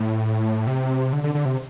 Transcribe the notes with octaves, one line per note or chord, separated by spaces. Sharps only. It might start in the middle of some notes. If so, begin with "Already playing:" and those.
Already playing: A2
C3
D3
D3
D3
C3